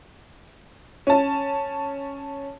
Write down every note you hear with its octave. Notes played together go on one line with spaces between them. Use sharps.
C#4 A5